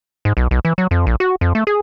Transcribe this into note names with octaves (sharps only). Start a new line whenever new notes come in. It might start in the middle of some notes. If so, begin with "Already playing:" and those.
G#2
B1
B1
E3
F#3
F2
A#1
F#4
F2
A3
G#4